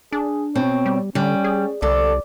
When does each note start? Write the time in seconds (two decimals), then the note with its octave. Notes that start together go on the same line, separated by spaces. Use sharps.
0.12 D4 G#4
0.55 B2 C4 C#5
0.86 G3
1.15 D3 G3 C#4
1.44 G#4
1.82 C2 D3 A4 D5